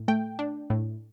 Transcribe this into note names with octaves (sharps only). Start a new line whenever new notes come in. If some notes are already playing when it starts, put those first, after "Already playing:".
Already playing: A2
A3 G5
D4
A2